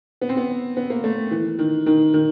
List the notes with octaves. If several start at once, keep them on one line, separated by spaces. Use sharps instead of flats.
B3
C4
B3
B3
A#3
A3
E3
D#3
D#3
D#3